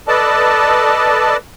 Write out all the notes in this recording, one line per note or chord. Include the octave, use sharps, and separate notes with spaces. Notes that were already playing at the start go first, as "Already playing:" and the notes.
A4 B4 D5 D#5 A5